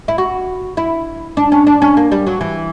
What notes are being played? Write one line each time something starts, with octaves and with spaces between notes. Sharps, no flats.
E4
F#4
E4
D4
C#4
D4
C#4
A#3
G3
F#3
E3